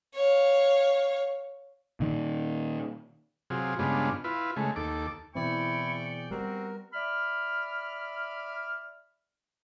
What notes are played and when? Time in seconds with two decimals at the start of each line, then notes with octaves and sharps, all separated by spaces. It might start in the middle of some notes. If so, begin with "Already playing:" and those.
0.14 C#5 F5
2.00 A#2 D#3
3.50 C3 F#3 F4 G#4
3.79 G2 C#3 G#3 B3 D4 F4
4.24 E4 F4 B4
4.56 C#3 G#3 A3
4.76 D#2 A4 D6
5.35 B2 E3 C4 E4 G#4 D5 G5 C#6
6.31 G3 A3 B3 C4 F#4 A#4
6.94 D5 E5 B5 F6